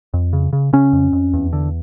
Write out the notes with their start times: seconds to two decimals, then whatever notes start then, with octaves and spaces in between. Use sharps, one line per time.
0.14 F2
0.33 C#3
0.53 C#3
0.73 C#3 C#4
0.93 F2
1.13 F2
1.34 E2
1.53 D3